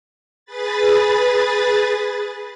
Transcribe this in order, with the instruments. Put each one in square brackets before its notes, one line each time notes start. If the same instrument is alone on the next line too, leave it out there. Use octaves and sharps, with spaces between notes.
[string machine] G#4 B4 B5 A6